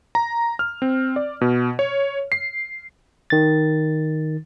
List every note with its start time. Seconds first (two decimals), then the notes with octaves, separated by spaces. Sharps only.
0.15 A#5
0.59 F6
0.82 C4
1.16 D5
1.41 B2
1.79 C#5
2.32 C7
3.30 D#3 A6